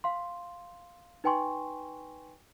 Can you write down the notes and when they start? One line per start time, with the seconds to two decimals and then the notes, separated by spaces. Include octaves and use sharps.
0.04 F5 C6
1.24 D#4 B4 G5 G#5 C6 C#6